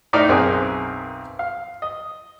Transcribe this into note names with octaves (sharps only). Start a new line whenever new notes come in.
A2 D#4 D5 F6
B1 F#2 C4 G#4 A#4
F5
D#5